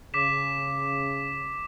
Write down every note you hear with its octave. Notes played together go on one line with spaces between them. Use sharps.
C#3 D6 B6 E7